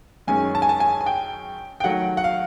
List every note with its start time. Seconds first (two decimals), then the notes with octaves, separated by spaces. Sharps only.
0.28 F#2 D#3 G#3 C#4 G#5
0.55 A5
0.62 G#5
0.69 A5
0.80 G#5
1.01 G#5
1.06 G5
1.80 G5
1.84 D#3 F#3 A3 F#5
2.17 F#5
2.24 F5